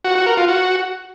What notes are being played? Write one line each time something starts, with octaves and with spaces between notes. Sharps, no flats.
F#4
F#4
A#4
F4
F#4